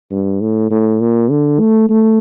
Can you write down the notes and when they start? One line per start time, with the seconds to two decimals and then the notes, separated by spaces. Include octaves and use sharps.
0.11 G2
0.41 A2
0.71 A2
1.00 A#2
1.30 D3
1.60 A3
1.89 A3